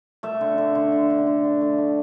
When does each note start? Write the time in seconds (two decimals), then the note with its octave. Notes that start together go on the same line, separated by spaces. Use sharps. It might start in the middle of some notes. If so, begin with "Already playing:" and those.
0.23 A3 E5
0.41 D3
0.58 D3
0.75 D3
0.92 D3
1.10 D3
1.27 D3
1.44 D3
1.61 A3
1.78 A3